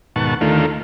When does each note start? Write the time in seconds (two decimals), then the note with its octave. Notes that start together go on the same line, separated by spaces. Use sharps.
0.16 D#2 G#2 B2 F#5 A5 C#6
0.41 D#2 D3 D#3 A3 F4